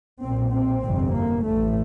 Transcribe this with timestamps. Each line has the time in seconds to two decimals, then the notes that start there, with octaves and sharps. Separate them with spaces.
0.21 B1 A#2 C4
0.52 C4
0.83 G1 F2 C3
1.13 A#3
1.43 A1 A2 A3